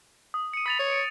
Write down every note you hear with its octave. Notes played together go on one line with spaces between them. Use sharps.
D#6
C#7 D#7
B5 D#6 A6 F7
C#5
D7